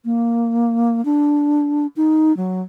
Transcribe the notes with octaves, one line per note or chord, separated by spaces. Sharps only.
A#3
D4
D#4
F#3